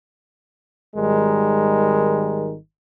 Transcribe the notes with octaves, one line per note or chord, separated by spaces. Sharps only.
G#1 D#3 G3 G#3 A#4